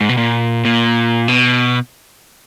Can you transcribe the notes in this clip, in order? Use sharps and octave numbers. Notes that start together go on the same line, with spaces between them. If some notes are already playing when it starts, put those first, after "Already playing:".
G#2
B2
A#2
A#2
B2